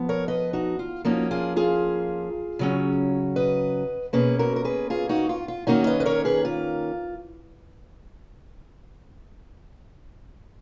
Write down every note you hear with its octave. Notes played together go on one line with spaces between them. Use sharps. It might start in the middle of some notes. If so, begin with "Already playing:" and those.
Already playing: F3 B3
A#4 C#5
B4 D#5
D#4 F#4
F4
F3 A#3 C#4 D#4 F#4
F4 G#4
F4 G#4
C#3 F#3 C#4
B4 D#5
B2 A#3 C#4 G#4 B4
F#4 A#4
A#4
G#4 B4
F4 G#4
D#4 F#4
F4
F4
D#3 A#3 C#4 D#4 F#4
B4 D#5
B4
A#4 C#5
G#4 B4
F4